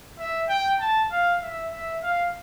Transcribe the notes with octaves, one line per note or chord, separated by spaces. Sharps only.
E5
G5
A5
F5
E5
E5
F5